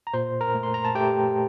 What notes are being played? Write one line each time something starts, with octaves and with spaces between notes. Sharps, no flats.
A#5
A#2 C5 C6
A#4 A#5
A3
C6
A#5
A5
A3 G4 G5